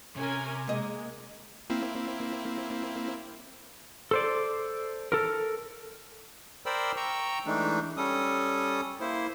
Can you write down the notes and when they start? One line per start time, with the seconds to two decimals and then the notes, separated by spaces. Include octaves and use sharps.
0.16 C3 C#4 A#4 G#5
0.67 G#3 A#3 D#5
1.70 A#3 C4 E4
4.11 A4 C5 D5
5.12 A4 A#4
6.66 A#4 C5 D5 G5 B5 E6
6.97 G5 A#5 C#6 E6
7.46 E3 G#3 A3 D4 D#4
7.97 G3 C#4 A4 D#6
9.01 A#3 E4 C5